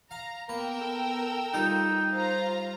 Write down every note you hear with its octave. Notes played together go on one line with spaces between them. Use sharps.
F5 A#5
A#3 B3 A#4 B4 G5 E6
B3 A4
G3 D#4 F4 A4
F4 C5 F5 A#5